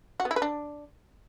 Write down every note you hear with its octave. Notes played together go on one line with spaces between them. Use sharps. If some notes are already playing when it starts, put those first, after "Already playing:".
F#4
B3
E4
B4
D4